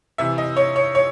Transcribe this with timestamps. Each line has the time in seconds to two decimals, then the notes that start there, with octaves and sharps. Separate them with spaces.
0.18 C3 E3 E5
0.38 D#5
0.57 C#5
0.76 C#5
0.95 C#5